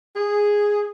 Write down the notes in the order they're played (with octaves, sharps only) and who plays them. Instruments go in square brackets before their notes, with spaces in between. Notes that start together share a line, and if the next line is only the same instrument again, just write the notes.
[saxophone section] G#4